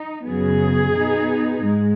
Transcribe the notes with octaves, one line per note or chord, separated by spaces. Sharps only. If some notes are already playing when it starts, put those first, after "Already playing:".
Already playing: D#4
F#2 C#3 F#3 B3 G#4
B2 B3 D#4
G#2 G#3